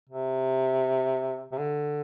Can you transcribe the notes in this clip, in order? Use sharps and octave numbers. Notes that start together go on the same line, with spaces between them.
C3
C3
D3